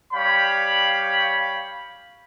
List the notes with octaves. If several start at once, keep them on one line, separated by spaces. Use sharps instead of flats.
G3 C#5 F5 G5 B5